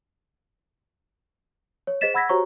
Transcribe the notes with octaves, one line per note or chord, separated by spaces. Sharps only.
C#5
G#4 C5 D#5 A6 B6 E7
F#5 B5 E6 G#6 A#6 B6
F#4 G4 C5 C#5 A#5 C#6